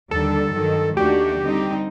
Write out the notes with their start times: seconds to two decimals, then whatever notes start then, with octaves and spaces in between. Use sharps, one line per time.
0.11 D#2 D3 G3 A4
0.53 G2 D#3 F#3
0.97 D#2 D#3 A3 D4 F#4 G4
1.39 D3 G3 C4 D#4